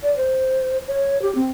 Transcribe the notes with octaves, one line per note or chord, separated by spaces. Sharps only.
D5
C5
C#5
G4
C4